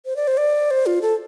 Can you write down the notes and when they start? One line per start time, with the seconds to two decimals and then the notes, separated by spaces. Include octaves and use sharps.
0.06 C5
0.16 D5
0.28 C5
0.37 D5
0.71 C5
0.86 F4
1.02 A4